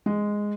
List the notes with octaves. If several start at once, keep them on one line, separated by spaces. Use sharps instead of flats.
G#3